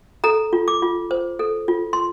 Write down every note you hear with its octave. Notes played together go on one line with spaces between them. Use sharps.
A4 A#5
F4
D6
F4
C5
A4
F4
C6